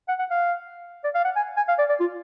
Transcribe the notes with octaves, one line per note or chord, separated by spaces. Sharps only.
F#5
F#5
F5
D5
F5
F#5
G#5
G#5
F5
D5
D5
F4